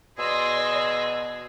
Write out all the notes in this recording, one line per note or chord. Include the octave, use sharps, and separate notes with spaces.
B2 G#4 D5 C6 E6 A#6